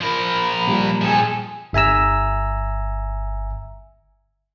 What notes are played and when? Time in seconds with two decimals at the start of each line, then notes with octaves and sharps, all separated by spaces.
0.01 F3 A#4 B5
0.67 A#2 G3
1.01 F3 G#4 A4 G5 G#5
1.73 G1 E5 G#5 A#5 E6